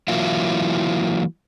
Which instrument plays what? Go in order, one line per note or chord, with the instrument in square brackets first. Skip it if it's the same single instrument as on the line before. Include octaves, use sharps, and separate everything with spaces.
[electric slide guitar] E3 F#3 A#3 E4 F4